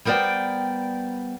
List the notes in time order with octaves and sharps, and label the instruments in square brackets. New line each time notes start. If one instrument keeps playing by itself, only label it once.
[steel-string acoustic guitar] G3 B3 A#4 C5 D5 G5